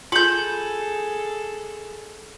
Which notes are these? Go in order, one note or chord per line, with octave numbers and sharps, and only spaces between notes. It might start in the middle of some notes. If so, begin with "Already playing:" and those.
F4 G#4 A4 B5 G6